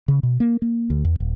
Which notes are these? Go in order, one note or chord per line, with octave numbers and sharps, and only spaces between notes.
C#3
B2
A#3
A#3
D2
E2
D#1